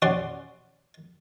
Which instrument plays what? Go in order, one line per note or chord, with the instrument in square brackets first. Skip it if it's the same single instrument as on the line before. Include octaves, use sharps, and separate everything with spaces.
[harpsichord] C#4 F#4 D5 C6